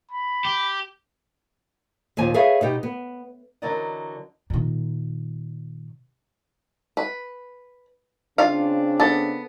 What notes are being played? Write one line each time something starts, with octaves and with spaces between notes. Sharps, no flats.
B5
G4
D#2 A#2 F3 G#5
G#4 A4 B4 C#5 E5 F5
B2 D#4 G4
B3
D3 E3 F#3 A#4 D5 D#5
A#2 D#3
B4
C#3 C4 D4 F4 F5
B3 A4